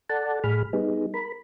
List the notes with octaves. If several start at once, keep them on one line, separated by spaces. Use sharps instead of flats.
A4 D5 F#5 A5
A2 G#4 B5 F6
G3 B3 D#4 G#4
A#4 B5